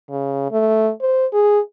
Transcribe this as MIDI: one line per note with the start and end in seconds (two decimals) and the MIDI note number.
0.10 0.47 49
0.51 0.91 57
1.01 1.26 72
1.33 1.59 68